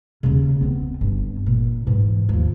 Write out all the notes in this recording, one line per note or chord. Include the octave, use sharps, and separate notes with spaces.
D#2 C#3
B3 C4
G1
A#2
G#2 E3
D#2 F3